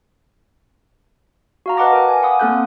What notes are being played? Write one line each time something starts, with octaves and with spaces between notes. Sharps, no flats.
F#4 F5 A#5
B4 D#5 F#5 A5 D6 A#6
A#4 G5
G#5
F5 F#5 B5 D6 D#6
A#3 C4 A4 F#6 G6